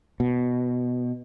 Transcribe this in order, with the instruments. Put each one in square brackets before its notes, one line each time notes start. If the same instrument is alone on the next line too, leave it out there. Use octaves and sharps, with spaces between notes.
[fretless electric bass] B2